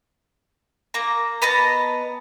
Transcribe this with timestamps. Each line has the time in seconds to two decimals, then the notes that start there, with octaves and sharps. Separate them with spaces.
0.94 A#3 A#5
1.42 B3 D#5 A5 A#5